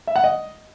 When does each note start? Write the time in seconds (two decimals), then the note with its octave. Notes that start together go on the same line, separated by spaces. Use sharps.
0.07 E5
0.16 F#5
0.24 D#5